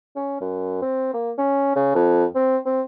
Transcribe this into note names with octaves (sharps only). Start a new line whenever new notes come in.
C#4
F#2
C4
A#3
C#4
C#3
F2
C4
C4